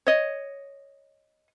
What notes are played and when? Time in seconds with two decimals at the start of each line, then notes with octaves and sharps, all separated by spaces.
0.07 C#5 D#5